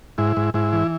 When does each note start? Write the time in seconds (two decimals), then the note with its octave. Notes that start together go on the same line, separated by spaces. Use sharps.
0.18 G#2 E4
0.37 G#2
0.54 G#2 E4
0.73 E3